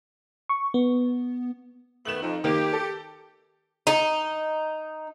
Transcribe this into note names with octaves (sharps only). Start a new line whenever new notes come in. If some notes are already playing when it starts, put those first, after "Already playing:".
C#6
B3
D#3 A3 B3 E7 F#7
F2 D#4
D#3 A#3 G4
A4
D#4